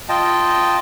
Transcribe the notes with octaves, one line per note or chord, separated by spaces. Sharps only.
F4 D#5 G5 A5